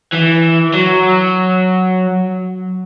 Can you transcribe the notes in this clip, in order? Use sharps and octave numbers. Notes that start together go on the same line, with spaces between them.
E3
F#3